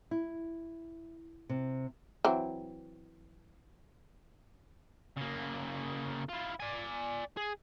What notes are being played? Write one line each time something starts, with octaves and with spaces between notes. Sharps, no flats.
E4
C3
E3 F#3 C4
C#3 A#3
E4 F4
D5 G#5
G#4